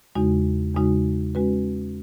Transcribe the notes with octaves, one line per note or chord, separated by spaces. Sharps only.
E2 C#3 G#3 D#4 F#4
E2 C#3 G#3 D#4 F#4
G#3 C#4 F#4 B4